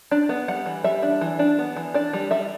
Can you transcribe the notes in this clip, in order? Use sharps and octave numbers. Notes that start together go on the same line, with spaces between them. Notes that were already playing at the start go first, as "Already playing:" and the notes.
D4 D5
B3
G3 F#5
E3
G3 E5
D4
E3
D4
B3
E3
D4 D5
G3
G3 E5